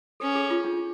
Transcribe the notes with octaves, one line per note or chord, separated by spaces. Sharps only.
C#4 A4
G#4
F4
D4